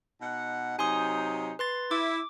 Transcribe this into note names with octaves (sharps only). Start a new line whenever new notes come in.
B2 D#4 F#5
C3 F#3 D#4 G#5 C6 D#6
B4 C6 A6
E4 D6